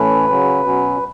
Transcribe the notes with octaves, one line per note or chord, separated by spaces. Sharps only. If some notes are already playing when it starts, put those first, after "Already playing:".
Already playing: A2 E3 A3 C#4 B4
C#3 F#3 C#4
B2 F#3 C#4